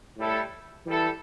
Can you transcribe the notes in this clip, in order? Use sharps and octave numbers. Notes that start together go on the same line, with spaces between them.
A2 G3 E4 A4
E3 G3 E4 A4